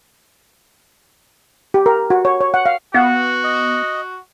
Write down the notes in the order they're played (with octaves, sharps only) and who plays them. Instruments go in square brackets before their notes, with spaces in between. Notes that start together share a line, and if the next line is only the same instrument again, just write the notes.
[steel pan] G4
A#4
F#4
C#5
C#5
F#5
F5
[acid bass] B3 [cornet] F#4 [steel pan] F5 F#5
[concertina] D#5